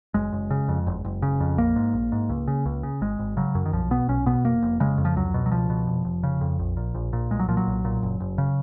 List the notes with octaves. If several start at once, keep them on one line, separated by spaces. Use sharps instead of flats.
F#1 G#3
F#1
C#3
F2
F#1
F#1
C#3
F2
A#1 A#3
G#2
A#1
G#2
C#2
C#3
C#2
C#3
G#1 G#3
G#1
C#3 F#3
F#2
D#3
B1 F3
B2 B3
B1 C#4
B2 B3
F1 A#3
F1
C#3 G#3
F2
F3
C#2 F#3
B2
F#3
C#2 F3
B2
F1
F1
C#3
F2
A#1
A#2
A#1
A#2
B1 G#3
F#3
A#2 F3
F#3
B1
A#2
F#1
F#1
C#3